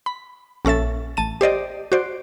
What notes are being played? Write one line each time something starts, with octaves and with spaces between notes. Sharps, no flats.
B5
A#1 C#4 A4 E5 A6
A1 A5 D#7
G4 C5 D5 D#5
F#4 C5 D5